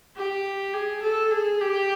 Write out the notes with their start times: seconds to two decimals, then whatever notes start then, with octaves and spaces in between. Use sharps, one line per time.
0.16 G4
0.74 G#4
1.03 A4
1.31 G#4
1.61 G4